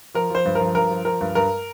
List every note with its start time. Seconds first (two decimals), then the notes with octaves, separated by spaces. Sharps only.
0.14 F3 A#4
0.30 F3 C5
0.46 G2
0.55 F3 A#4
0.75 G2 A#4
0.91 F3
1.05 F3 A#4
1.21 G2
1.35 G2 A#4